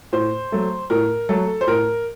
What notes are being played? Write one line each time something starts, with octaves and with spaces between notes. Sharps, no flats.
A2 C5
F#3 A3
A2 A#4
F#3 A3 A4
C5
A2 A#4